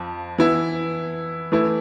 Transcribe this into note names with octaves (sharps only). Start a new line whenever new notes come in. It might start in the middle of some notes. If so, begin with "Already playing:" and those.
Already playing: F2 F3
E3 B3 E4
E3 A3 E4